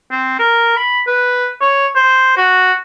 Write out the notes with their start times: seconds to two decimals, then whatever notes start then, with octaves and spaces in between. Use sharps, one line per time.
0.11 C4
0.39 A#4
0.77 B5
1.07 B4
1.61 C#5
1.96 C5
2.37 F#4